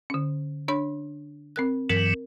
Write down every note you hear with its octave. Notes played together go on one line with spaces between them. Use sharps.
D3 C#4
D4 C#5 B5
C4 A#4 F#6
G2 E3 F#3 A#4